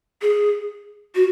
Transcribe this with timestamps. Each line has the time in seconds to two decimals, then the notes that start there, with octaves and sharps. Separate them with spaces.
0.22 G#4
1.15 F#4